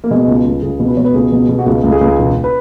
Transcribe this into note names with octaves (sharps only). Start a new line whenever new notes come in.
A#3
B2 G#3
C#2
C#2
C#2 G#4
B2
B4
B2 C#5
B4
C#2 G#4
B2
B2
F#4
C#2 G#4
C#2
G#4
C#2
E1
B4